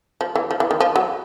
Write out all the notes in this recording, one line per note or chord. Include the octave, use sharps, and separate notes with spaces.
F3
E3
F3
E3
D#3
F3
F#3